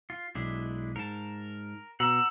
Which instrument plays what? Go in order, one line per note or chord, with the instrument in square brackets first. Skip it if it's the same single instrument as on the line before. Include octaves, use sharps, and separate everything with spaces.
[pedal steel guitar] F4
[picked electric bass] B1 [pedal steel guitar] G#3 D4 E4
[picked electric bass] G#2 [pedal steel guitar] A#4 A5
[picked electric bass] B2 [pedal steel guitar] F#5 A#5 [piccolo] E6